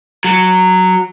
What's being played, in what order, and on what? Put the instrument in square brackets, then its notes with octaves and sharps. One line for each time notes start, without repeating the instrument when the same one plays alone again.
[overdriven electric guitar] F#3